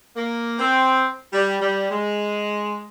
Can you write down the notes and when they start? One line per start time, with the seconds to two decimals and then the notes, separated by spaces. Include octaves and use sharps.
0.16 A#3
0.59 C4
1.33 G3
1.61 G3
1.91 G#3